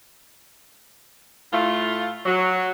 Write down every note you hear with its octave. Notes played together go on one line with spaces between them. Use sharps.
A2 A3 F4
F#3